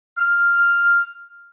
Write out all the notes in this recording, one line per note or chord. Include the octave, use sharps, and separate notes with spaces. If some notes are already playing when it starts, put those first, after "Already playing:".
F6